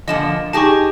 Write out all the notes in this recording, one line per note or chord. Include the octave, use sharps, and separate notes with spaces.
A#2 D3 F3 D#5 E7
D#4 G4 G#4 A5 C#6